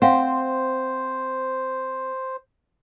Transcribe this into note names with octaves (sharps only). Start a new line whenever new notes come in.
C4 C5 F5 F#5